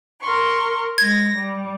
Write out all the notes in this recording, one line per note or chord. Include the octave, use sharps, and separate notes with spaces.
A#4 C6 C#6
G#3 G#6 A#6
G3